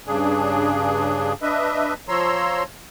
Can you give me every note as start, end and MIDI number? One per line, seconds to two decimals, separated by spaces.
0.07 1.33 43
0.07 1.33 49
0.07 1.33 62
0.07 1.33 68
1.42 1.94 62
1.42 1.94 71
1.42 1.94 75
1.42 1.94 76
2.08 2.63 53
2.08 2.63 73
2.08 2.63 82
2.08 2.63 84
2.08 2.63 88